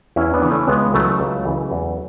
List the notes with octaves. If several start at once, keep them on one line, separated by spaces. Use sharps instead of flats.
E2 C#4 E4
B3 D4
C#3 E3
A3 C#4
C#2 G#3 B3
C#3 E3 F#3 A3
C#2
C#3 E3
E2